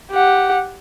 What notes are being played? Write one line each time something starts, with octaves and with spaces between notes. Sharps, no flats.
G4 F#5